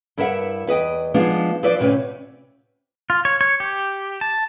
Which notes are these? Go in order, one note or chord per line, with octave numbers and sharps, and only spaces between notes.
G2 E4 A#4 B4 E5 F#5
E2 B4 D#5 G5
F3 G#3 B3 D4 D#4
F3 E4 B4 C5 D5
D2 A2 C3 C#4 B4
F4
C#5
C#5
G4
A5